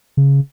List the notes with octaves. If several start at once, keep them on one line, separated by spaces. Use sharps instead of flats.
C#3